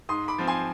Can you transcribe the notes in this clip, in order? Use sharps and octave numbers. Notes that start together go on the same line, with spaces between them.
G#2 C6 D#6
B5 D6
F3 C4
G#5 C6